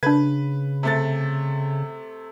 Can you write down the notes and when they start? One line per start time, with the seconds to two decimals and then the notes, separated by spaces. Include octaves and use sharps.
0.03 C#3 D4 B4 G#6
0.83 C3 A3 A6